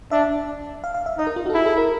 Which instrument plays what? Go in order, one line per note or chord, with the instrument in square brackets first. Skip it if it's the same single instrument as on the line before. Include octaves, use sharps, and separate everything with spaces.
[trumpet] D4 [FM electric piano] E5
[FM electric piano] F5
F5
E5
[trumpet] D#4 [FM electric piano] D#5
[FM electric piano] A#4
F4
F#4
A4
[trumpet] E4 [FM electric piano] G#4
[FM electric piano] A4
A#4